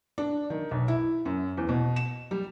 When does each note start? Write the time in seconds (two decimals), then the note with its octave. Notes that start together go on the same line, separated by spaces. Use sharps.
0.18 D4
0.50 D#3
0.71 B1
0.88 E4
1.25 F#2
1.57 E2
1.69 B2
1.96 E7
2.31 G3